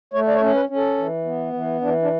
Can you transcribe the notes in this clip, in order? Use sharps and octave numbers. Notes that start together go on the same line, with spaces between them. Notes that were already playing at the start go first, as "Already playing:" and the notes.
A3 C#5
D5
C#5
C#4
B4
C#4
A4
E3
B3
E3
E3 D4
D4